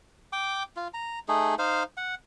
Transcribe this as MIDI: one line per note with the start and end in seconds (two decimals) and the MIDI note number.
0.33 0.63 79
0.33 0.63 86
0.76 0.88 65
0.94 1.19 82
1.28 1.55 57
1.28 1.55 63
1.28 1.55 68
1.59 1.83 63
1.59 1.83 72
1.59 1.83 77
1.97 2.15 78